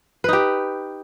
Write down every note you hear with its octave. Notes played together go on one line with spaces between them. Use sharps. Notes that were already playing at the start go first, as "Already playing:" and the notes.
D#4 G4 B4